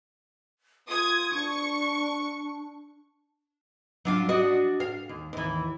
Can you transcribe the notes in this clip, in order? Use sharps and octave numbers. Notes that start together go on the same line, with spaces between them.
F4 D#6 G#6
D4 C#6
F#3 D4 F4
D4 F#4 D#5
F5
D#2
D#2 E3